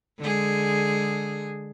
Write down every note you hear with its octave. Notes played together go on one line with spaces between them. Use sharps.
D3 G#3 G#4